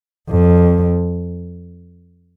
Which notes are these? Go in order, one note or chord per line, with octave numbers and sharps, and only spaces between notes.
F2